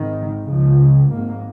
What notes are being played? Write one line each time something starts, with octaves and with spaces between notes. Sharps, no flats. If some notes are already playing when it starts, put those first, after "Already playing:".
Already playing: G#1 G#2 D#3
C#2 C#3 F3
G#1 G#2 A#3